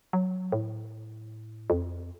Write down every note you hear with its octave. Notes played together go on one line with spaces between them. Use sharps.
F#3
A2
F2